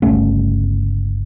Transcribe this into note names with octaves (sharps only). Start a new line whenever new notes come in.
G1 C#2 A3 C#4